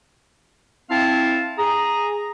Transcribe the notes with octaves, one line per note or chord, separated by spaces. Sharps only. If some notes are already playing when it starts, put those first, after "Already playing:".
C4 E4 F5 A5
G#4 A#5